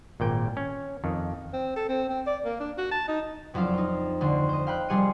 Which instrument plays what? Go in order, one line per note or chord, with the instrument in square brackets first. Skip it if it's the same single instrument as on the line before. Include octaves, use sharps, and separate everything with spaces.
[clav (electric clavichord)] G#1 A#2 G5
C#4
F2 D#3
[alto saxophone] C4
A4
C4
C4
D5
A#3
D4
F#4
A5
D#4
[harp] F#1 F2 F#3 D4 F5
D#4 F4
D2 D3 C6
C5 D#5
F5 G5 B5 F#6
F1 G3 G#4 C6 C#7 D#7